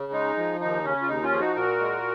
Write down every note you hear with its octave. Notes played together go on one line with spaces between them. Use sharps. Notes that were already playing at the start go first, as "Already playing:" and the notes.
Already playing: C#3
G#3 D#4
F3
D#2 D#4
C#3 C#4
F4
D#2 D#4
C#4 F4
F3 G#4
D#4 F#4
A#2 F#4 A#4
G#3